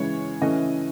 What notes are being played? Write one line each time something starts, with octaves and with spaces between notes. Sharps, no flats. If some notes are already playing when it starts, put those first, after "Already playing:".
Already playing: C#3 E3 G#3 C#5
C#3 E3 A3 C#4 D#5